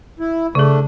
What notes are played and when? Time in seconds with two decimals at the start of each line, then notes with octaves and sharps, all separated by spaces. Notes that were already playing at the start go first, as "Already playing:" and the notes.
0.19 E4
0.55 C#3 A3 D4 G#4